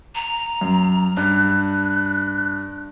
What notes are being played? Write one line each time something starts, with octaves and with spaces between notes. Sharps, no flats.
A#5
F#2
G2 F#6